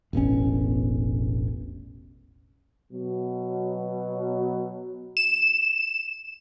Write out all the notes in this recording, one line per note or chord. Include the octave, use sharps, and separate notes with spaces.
E1 A1 B2 C#4
B2 F#3
E7